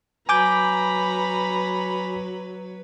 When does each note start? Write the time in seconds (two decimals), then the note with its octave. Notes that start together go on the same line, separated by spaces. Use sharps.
0.29 F#3 B4 G#5 A#5 B5 D6 G6